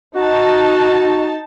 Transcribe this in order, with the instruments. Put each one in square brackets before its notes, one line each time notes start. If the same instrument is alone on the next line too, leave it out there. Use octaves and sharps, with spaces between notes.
[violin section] D#4 A5 [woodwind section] F#4